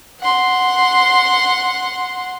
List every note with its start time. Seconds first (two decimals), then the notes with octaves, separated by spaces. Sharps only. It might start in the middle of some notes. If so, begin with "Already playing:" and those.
0.20 F#5 C6